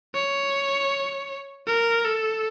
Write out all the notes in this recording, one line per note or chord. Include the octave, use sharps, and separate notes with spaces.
C#5
A#4
A4